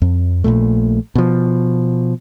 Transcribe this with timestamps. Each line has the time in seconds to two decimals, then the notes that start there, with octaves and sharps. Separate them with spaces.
0.02 F2
0.44 A#1 G2 A#2 A3
1.15 B2 F3